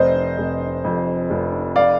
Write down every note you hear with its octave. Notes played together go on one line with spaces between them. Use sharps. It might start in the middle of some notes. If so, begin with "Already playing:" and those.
Already playing: F1 C5 D#5
F1
F2
F1
D5 F5